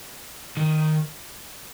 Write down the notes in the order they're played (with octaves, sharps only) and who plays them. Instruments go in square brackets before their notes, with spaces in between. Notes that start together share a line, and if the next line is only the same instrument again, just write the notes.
[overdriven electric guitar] D#3